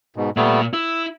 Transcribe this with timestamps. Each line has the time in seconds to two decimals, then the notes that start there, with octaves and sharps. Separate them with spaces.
0.16 G#2 B2
0.37 A#2 G3 A3 B3
0.73 E4 E6